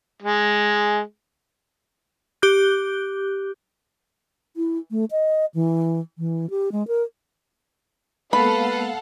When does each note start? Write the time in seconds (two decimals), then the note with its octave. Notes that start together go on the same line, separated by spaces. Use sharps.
0.22 G#3
2.42 G4 D6 F#6 G6
4.57 E4
4.91 A3
5.11 D#5
5.54 E3
6.18 E3
6.50 G4
6.72 G#3
6.88 A#4
8.33 G#3 A#3 B3 A4 B4 F5 F#5 B5